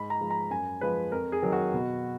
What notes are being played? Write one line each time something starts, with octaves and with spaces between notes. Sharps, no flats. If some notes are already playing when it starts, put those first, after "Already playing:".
Already playing: G#2 B5
A#5
F3 G#3
A#5
F#2 G#5
F3 G#3 B4
F2 A#4
G#4
D#3 F#3
F#4
B2